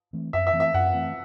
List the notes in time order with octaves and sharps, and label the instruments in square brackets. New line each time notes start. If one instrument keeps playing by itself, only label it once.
[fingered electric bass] E3 A3 C4
[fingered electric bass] F#2 [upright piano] E5
[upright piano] E5
[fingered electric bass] E3 A3 C4
[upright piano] E5
[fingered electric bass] F#2 [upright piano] F#5
[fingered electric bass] E3 A3 C4